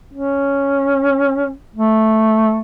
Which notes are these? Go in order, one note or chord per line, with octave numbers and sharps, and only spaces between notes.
C#4
A3